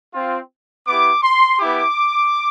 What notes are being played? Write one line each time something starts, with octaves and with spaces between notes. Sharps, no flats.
C4 F4
B3 E4 G4 D6
C6
B3 E4 G4 D6